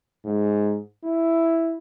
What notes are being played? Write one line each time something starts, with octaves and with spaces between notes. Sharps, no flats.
G#2
E4